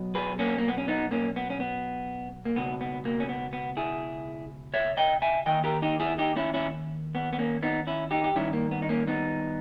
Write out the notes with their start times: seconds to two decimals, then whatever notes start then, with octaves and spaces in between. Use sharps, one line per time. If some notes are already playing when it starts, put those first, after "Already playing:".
Already playing: B1 B2
0.15 G#4 B4
0.39 A#3 C#4
0.58 A#3
0.68 B3
0.78 C#4
0.88 B3 D#4
1.11 A#3 C#4
1.36 B3
1.50 C#4
1.60 B3
2.45 A#3
2.56 C#2 B2 B3
2.81 B3
3.05 A#3
3.20 C#4
3.29 B3
3.53 B3
3.77 E4 G#4
4.74 C#5 E5
4.97 D#5 G5
5.22 E5 G#5
5.46 D#2 D#3 D#5 G5
5.64 G4 A#4
5.82 D#4 G4
6.00 E4 G#4
6.18 D#4 G4
6.36 C#4 E4
6.54 C#4 E4
7.15 B3
7.33 B3
7.39 A#3 C#4
7.63 B3 D#4
7.87 C#4 E4
8.11 D#4 G4
8.24 G4
8.35 G2 D#3 C#4 E4
8.53 A#3
8.71 B3
8.82 D#4
8.89 A#3 C#4
9.07 B3 D#4